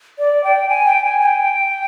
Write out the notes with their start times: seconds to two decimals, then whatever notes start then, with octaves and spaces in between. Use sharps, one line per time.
0.19 D5
0.44 G5
0.69 G#5
0.86 G5
1.04 G#5
1.21 G#5
1.26 G5